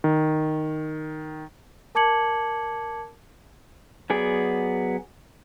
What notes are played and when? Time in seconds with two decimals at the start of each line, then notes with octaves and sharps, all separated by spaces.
0.04 D#3
1.95 A#4 A5 D6 G#6 C#7 F#7
4.10 F#3 B3 G#4 D5